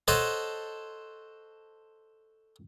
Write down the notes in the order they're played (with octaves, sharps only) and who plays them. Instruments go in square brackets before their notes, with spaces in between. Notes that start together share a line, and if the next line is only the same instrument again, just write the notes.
[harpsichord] A4 C5 C#5 D#5 F#5 A5